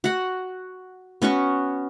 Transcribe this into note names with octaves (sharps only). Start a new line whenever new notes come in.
F#4 F#5
B3 C#4 F#4 C#6